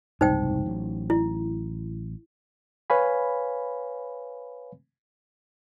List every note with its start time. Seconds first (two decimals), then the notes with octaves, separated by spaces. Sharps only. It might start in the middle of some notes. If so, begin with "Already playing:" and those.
0.21 F#1 C2 G#2 D#4 C5 G5
0.66 A1 F#3
1.10 E4
2.90 B4 C#5 F5 G#5 B5